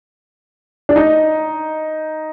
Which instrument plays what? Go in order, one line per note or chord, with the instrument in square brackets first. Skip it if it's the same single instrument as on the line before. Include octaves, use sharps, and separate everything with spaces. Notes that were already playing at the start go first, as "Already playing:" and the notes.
[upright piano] D4
D#4